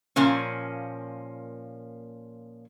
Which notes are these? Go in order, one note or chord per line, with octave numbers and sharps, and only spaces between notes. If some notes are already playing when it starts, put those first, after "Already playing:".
A#2 F3 A#3 C#4